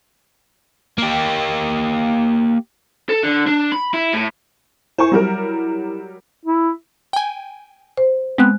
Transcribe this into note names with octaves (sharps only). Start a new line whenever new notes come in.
A#3 G4
A4
D3
D4
B5
E4
A2
E4 C5 G#5 C#6
F#3 G3 A#4
E4
G5 G#5
C5
G#3 B3 C4 F#6